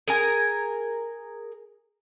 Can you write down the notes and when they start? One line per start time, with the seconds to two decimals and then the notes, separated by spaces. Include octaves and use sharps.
0.08 G#4 A#4 G#5